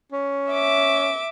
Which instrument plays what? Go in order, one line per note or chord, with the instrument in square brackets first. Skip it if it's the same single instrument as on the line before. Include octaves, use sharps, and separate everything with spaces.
[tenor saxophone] C#4
[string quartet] E5 D6